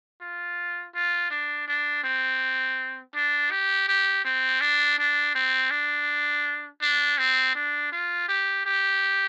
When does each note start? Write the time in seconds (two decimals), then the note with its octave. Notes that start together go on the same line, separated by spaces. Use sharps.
0.21 F4
0.95 F4
1.31 D4
1.68 D4
2.04 C4
3.15 D4
3.51 G4
3.88 G4
4.25 C4
4.61 D4
4.98 D4
5.35 C4
5.71 D4
6.82 D4
7.18 C4
7.56 D4
7.92 F4
8.28 G4
8.66 G4